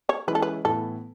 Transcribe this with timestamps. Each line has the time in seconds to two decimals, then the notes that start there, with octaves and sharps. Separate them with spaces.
0.09 C#5
0.27 E3 G#3 C#4 E4 B4
0.35 A4
0.42 B4
0.65 A2 E3 B3 E4 A4